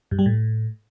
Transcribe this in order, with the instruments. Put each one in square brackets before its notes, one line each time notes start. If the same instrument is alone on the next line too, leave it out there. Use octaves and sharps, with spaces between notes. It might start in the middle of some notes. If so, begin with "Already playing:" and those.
[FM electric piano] G2
G3
A2